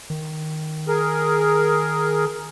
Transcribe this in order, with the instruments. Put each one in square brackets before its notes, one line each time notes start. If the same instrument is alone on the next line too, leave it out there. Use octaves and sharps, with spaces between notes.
[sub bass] D#3
[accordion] G#4 A#4